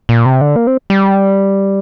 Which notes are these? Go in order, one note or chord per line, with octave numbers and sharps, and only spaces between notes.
A#2
C3
D3
A#3
C4
G3